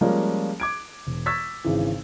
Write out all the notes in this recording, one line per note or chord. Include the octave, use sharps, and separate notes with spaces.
F3 G3 G#3 A#3 C#4
D6 G#6 D7
E1
C#6 E6 G#6 A6 B6
G#1 C#3 E3